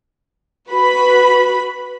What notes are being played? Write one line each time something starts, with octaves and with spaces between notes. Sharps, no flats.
F#4 B4 B5